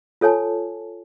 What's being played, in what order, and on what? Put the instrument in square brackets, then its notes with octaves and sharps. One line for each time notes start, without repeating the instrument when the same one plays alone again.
[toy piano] F4 A4 C#5 G#5 A5